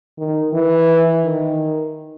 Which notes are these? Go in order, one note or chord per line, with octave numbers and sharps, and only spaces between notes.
D#3
E3
D#3